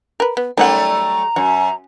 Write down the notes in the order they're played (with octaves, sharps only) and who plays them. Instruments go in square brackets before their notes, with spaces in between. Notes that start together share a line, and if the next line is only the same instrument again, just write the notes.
[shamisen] A#4 B4
B3
[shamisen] D#3 C#4 F#5 [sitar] F#3 G3 A3 [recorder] A#5
[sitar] F#2 [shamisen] F#4